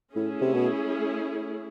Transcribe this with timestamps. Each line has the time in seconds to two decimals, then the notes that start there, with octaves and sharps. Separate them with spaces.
0.15 A2 A3 C#4 E4 G#4
0.41 C3
0.54 B2